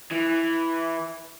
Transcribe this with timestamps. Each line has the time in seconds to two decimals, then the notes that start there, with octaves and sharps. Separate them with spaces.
0.11 E3